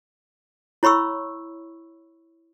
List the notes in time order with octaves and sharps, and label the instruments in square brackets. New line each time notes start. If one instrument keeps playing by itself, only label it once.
[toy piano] E4 C#5 B5 C#6 E6